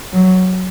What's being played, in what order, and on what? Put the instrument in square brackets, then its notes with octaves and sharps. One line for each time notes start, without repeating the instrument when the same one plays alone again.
[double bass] F#3